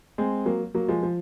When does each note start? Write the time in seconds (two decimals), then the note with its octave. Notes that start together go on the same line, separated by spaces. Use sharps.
0.18 G#3 C4
0.45 F#3 A#3
0.74 F#3 A#3
0.88 F3 G#3
1.03 F3